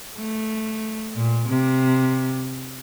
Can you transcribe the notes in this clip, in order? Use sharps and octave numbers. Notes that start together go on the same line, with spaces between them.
A3
A#2
C3